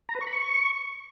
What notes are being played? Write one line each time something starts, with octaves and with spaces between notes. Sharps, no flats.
A#5
B4
C#6
B5
C#6